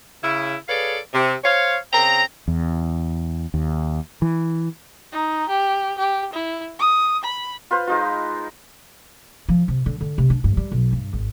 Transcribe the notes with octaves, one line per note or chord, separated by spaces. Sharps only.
C#3 E4
G#4 A4 B4 C#5 D5 F5
C3
C5 C#5 F5
C#3 C4 G5 A#5
E2
D#2
E3
D#4
G4
G4
E4
D#6
B5
F4 B4 C5
G#3 D#4 F4
F3
C3
D3
D3
C3
D4
G2
G3
B1
G2
G#1